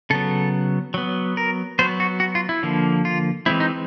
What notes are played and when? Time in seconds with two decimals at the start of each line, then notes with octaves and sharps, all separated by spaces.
0.10 C#3 F#3 B3 A4
0.94 F#3 B3
1.37 A#4
1.79 F#3 B3 C5
2.00 F#4
2.20 F#4
2.35 F4
2.49 E4
2.63 D3 F3 A#3
3.05 F4
3.46 E3 G#3 C4 E4
3.60 D#4